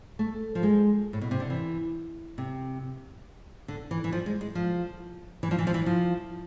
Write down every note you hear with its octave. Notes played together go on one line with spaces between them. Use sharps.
A3
F3
G#3
A2
B2
C3
D3
E3
C3
D3
E3
E3
F3
G#3
G#3
F3
E3
F3
E3
F3
E3
F3